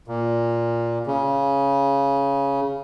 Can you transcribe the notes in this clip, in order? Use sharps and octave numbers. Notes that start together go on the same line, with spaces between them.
A#2
C#3